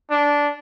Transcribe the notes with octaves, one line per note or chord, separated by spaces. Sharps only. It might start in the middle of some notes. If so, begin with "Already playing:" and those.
D4